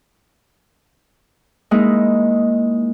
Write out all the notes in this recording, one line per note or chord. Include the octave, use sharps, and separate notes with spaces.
G#3 A#3 D#4 E4